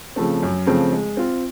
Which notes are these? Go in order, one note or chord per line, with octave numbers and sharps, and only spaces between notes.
C#3 F3 A3 C4
F#2
C#3 F3 A3 C4
G#3
C4 F4